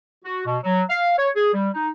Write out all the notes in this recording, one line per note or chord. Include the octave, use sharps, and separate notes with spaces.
F#4
B2
F#3
F5
C#5
G#4
G3
D#4